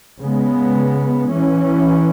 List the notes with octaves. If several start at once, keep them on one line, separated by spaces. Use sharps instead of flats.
C#3 G#3 B3
E3 C#4